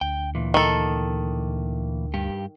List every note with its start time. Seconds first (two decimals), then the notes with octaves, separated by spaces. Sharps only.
0.01 D2 G5
0.35 A#2 E3
0.54 D#3 A4
2.14 G2 G4